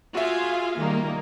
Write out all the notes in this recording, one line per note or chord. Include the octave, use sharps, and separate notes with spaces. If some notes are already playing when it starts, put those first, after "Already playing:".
F4 F#4 G#4 E5 F5
D#3 G3 A#3 A#4